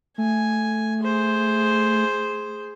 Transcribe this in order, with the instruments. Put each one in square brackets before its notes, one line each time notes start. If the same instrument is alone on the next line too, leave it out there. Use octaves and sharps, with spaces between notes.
[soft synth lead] A3 [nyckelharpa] G#5
[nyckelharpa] G#4 C5